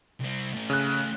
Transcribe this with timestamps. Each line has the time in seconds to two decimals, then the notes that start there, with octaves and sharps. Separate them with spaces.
0.20 C2 C4
0.53 A3 C#4
0.70 C#3 F#6